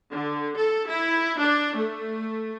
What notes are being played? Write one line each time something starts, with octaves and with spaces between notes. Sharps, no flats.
D3
A4
E4
D4
A3